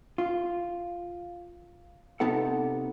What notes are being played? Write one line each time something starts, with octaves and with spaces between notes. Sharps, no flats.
F4
C3 B3 D#4 A4 F#5